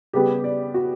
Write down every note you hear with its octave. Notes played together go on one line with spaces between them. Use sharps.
C#3 G3 B3 G4
D5
F#4